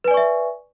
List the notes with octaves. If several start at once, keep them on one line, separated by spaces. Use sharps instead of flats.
B4 D5 E5 G#5 C#6